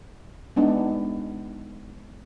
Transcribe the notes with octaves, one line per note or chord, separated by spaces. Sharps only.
G#3 B3 D4 D#4